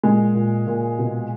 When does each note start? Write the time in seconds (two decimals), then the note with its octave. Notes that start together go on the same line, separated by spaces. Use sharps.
0.03 A#2 G#3
0.35 A#2
0.67 A#2
0.99 B2